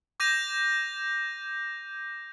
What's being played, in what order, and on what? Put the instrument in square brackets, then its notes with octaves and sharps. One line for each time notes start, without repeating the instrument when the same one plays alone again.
[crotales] D6 G6 A#6 D#7 F7